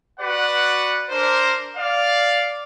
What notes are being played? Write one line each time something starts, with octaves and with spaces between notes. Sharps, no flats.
F#4 B4 D5 F#5
D4 A#4 C5
D5 F5